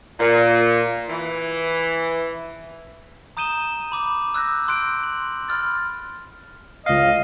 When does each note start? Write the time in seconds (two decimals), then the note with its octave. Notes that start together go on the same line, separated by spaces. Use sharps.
0.20 A#2
1.09 E3
3.37 A#5 D#6 G6 D#7 E7 G7
3.92 B5 D6
4.34 E6 F#6 G6 A#6
4.68 C6 F#6 G6 D7
5.03 F#7
5.49 B5 C6 F6 A6
6.86 C#2 D#5 F5